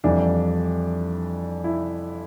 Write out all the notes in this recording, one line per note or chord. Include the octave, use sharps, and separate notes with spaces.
F2 E3 G3 D4
E4